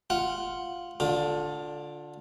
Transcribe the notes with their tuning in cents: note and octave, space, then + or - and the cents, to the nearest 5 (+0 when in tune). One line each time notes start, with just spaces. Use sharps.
F4 +0 F#5 +0
D3 +0 F4 +25